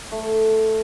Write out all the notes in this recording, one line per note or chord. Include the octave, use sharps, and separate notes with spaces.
A3